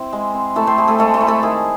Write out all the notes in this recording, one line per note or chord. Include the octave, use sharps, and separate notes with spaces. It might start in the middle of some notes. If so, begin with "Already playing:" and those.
Already playing: C4 E4
G#3
C4
A3 E4 A4
C4 C5
E4 G#4
A3 A4
G#3 A3 A4
A3 A4
E4
A3 A4
D#3 G#4